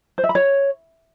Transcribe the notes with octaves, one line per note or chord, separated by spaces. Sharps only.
C5
E5
B5
C#5